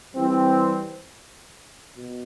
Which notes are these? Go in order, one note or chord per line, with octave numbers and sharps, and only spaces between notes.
E3 G3 C4
B2